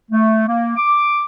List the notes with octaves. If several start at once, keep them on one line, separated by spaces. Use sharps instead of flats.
A3
A#3
D6